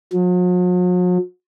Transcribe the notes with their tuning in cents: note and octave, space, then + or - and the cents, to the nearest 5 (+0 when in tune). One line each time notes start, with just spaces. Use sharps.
F#3 -45